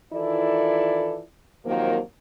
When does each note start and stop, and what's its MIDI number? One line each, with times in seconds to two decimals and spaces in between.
0.14 1.20 51
0.14 1.20 52
0.14 1.20 64
0.14 1.20 65
0.14 1.20 69
0.14 1.20 74
1.65 1.98 48
1.65 1.98 51
1.65 1.98 53
1.65 1.98 54
1.65 1.98 58